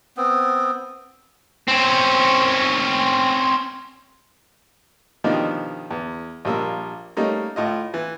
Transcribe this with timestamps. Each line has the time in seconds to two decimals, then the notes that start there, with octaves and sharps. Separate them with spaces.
0.17 B3 C4
1.68 C4 C#4
5.24 B2 D#3 F3 D4 D#4 G4
5.91 E2
6.45 A#1 G3 A#3 E6
7.17 G3 A3 A#3 C#4 D#4
7.56 A2 F4 D#5
7.94 E3